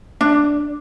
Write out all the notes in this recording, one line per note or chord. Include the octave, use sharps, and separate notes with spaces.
D4